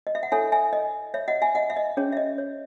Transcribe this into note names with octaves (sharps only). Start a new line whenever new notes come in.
D#5
E5
F#5
E4 A4 C#5 E5 G#5
E5 G#5
D#5
C#5 E5
D#5 F#5
E5 G#5
D#5 F#5
E5
D#5
C#4 G#4 C#5
E5
D#5
C#5